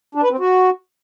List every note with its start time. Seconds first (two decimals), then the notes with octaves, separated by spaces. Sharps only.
0.15 D4
0.23 B4
0.31 C4
0.39 F#4